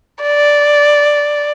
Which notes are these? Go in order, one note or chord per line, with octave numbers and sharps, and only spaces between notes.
D5